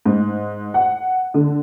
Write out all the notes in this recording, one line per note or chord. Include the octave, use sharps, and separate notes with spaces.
G#2
F#5
D3